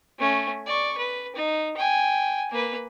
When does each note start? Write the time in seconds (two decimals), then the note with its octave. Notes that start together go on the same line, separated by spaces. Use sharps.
0.19 A3 C#4
0.66 D5 C#6
0.98 B4
1.36 D#4
1.77 G5 G#5
2.51 A#3 B4